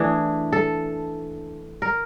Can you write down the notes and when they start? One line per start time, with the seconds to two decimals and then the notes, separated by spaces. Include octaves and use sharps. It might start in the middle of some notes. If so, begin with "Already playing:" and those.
Already playing: E3 A3 D4 G#4
0.52 A4
1.82 A#4